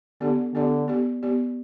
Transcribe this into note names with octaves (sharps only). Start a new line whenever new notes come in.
D3 B3 G4 D5
D3 B3 G4 D5
B3 G4 D5
B3 G4 D5